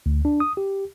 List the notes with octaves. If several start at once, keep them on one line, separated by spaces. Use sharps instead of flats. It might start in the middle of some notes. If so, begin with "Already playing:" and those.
D2
D4
D#6
G4